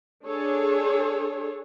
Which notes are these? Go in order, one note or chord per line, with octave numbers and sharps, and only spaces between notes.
D4 G#4 A4 C#5